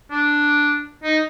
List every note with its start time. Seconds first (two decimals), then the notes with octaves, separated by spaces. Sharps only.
0.11 D4
1.04 D#4